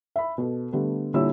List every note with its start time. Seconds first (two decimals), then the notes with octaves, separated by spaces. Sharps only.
0.16 E5 B5
0.38 B2 A4
0.72 D3 G3 A3 B3
1.14 A#2 D3 G3 E4 C#5 E6